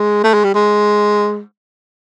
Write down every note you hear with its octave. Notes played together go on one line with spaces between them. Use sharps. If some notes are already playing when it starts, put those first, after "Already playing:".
Already playing: G#3
A3
G#3
G3
G#3